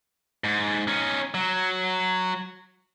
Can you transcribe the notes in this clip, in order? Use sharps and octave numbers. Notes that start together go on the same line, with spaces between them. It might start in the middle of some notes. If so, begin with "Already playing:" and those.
G#2
C#4 D#4
F#3